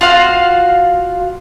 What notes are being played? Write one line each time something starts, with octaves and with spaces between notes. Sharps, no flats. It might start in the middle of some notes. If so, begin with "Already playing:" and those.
F4 F#4 F5